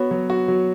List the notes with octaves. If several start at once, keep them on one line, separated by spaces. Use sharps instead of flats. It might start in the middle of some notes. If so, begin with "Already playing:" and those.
Already playing: B3 F#4 C#5
F#3
F#4
F#3